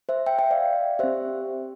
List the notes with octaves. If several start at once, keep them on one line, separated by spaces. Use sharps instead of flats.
C5 E5
E5 G5
E5 G5
D5 F5
C4 G4 C5 E5